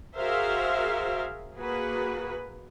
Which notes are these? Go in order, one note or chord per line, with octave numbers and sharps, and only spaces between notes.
F#4 G#4 A#4 C5 E5 F5
A#3 F#4 G#4 B4